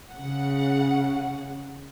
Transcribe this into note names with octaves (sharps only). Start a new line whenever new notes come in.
C#3 F#5